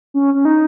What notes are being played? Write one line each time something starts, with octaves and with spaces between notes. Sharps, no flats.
C#4
C#4
D#4